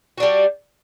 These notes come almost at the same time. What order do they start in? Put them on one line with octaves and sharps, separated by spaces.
F#4 D4 G3